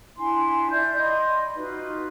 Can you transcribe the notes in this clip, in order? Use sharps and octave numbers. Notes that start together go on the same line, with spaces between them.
D4 E4 G#5 C6
F4 D5 E5 G6
D#5 B5 C6
D#4 F4 F#4 B4